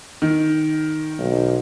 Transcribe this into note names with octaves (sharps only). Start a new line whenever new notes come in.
D#3
B1